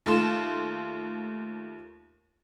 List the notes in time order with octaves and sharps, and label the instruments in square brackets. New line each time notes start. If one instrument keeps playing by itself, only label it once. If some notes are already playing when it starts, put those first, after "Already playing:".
[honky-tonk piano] D#2 A3 F4 C6 E7